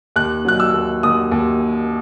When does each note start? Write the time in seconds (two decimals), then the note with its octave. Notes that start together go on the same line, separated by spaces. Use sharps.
0.16 D#2 F#6
0.45 F#3 F#6
0.60 E6
0.74 D#2
1.03 D#2 D#6
1.32 D#2